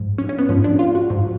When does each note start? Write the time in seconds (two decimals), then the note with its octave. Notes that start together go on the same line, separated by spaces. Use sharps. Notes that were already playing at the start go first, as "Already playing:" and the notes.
Already playing: G#2 F3
0.18 C#4
0.29 C#4
0.39 B3
0.49 G#2 F3 C#4
0.64 D4
0.79 F4
0.95 F#4
1.10 G#2 F3